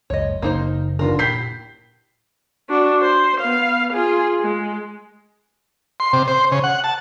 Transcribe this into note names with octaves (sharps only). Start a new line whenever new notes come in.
F#1 C#2 C#5 D#5
F#1 A#3 D#4 C5
D#2 D3 B3 F4 A#4
A#2 E4 G4 G6 B6 C7
D4 F#4
C5
B3 F5
F4 G#4
G#3
C6
C3
C5
C#3
F#5
A5